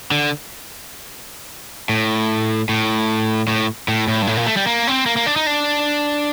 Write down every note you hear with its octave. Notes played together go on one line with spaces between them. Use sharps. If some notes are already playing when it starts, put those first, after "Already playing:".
D3
A2
A2
A2
A2
A2
G2
A2
A#2
A3
G3
A#3
C4
A#3
A#3
D4
D#4
D4